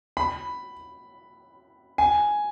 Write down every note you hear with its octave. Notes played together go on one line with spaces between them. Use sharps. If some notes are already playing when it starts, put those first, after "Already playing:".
B5
G#5